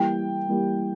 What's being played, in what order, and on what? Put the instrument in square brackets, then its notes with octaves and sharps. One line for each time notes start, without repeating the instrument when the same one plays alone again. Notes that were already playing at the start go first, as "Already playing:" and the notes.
Already playing: [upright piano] E3 G3 A#3 G5
E3 G3 A#3